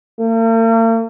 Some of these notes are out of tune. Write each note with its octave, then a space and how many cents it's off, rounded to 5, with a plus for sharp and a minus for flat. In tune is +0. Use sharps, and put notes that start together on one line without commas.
A#3 -45